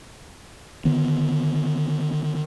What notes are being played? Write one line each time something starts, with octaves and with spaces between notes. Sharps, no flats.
D3 D#3 B3